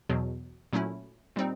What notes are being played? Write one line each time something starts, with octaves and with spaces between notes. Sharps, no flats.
E2 B2 F#3
A#2 F#3 A3 C#4 E4
A#2 G3 C4 D#4